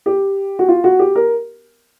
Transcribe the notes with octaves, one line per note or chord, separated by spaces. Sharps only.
G4
F#4
F4
F#4
G4
A#4